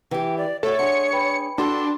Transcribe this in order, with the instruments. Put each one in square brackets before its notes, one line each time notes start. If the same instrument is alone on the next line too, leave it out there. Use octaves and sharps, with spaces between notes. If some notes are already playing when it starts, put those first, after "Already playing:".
[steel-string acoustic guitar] E3 G4 [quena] G5
[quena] D5
[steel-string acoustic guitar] A3 F#4 [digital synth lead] A4 [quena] C#5
[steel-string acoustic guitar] D4 G#4 [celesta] F#5 C6 [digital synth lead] C#7
[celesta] B4 G5 B5
[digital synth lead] D4 [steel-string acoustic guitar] F#4 A4 [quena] C6